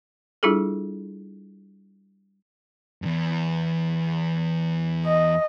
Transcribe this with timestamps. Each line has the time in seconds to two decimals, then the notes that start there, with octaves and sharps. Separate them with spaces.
0.43 G3 D4 E4 F4 G#4 A4
3.02 E2 G2
5.06 D#5